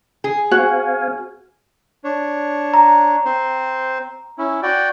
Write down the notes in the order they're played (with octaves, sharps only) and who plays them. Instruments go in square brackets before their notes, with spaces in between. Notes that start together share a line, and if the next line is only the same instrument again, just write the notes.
[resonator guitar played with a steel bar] G#4
[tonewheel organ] C4 F5 G#5 [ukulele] F#4
[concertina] D4 C#5
[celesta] A#5
[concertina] C4 C5
C#4 E4
F#4 D5 G5